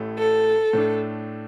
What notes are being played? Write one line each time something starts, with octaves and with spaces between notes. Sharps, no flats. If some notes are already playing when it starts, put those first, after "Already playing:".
Already playing: A1 A2 A3
A4
A2 A3 D4